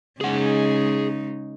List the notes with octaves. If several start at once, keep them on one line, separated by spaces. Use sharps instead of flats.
C#3 G#3 D#4 G#4 F#5